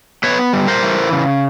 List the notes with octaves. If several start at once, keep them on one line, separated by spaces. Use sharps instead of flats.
B3 B4 C#5
G3
A#4 C5
E3
C#3